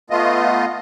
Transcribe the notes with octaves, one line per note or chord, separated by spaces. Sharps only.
A3 B3 F4 D#5